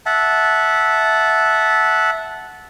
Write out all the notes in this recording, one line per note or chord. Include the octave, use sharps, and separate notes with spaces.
E5 F#5 A5